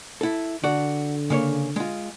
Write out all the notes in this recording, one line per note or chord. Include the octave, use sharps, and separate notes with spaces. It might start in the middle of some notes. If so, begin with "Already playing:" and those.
E4 A4
D3 F#4 A4 D5
C#3 A#3 C#5
G#3 F4